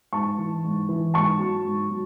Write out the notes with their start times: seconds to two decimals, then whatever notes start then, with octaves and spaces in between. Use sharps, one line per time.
0.13 G#2 A5 C#6
0.38 E3
0.64 G#2
0.89 E3
1.14 G#2 A5 C#6
1.39 F#3
1.65 G#2
1.90 F#3